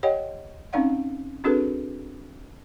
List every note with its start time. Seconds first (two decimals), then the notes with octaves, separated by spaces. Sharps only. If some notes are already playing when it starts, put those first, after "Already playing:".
0.03 G4 C#5 D#5 F#5 G5
0.73 C4 C#4 D#4 D5 F5 F#5
1.44 C4 D4 F#4 G#4 A4 B4